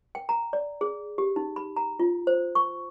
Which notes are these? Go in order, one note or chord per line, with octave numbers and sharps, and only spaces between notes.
G5
A#5
D5
G#4
G4
D#4
B5
A#5
F4
C5
C#6